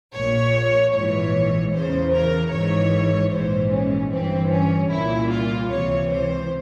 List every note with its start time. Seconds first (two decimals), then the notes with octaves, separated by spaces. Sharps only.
0.14 A#1 A#2 C#5
0.94 A#1 G#2 E3 C#5
1.73 E2 C#3 E3 C5
2.13 A#4
2.53 G#1 G#2 E3 C#5
3.33 A#1 G#2 E3 C5
3.72 C#4
4.12 G1 G2 E3 C4
4.52 C#4
4.92 C2 A#2 E4
5.32 F4
5.71 C#2 C3 E3 C#5
6.12 C5